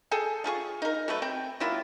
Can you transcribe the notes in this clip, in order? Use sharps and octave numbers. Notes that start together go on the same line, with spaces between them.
G#4 A4 G5
A3 F4 G#4 C#6
D#4 A#4
F#3 A3 B4
C4 G5
F#3 A#3 E4 F4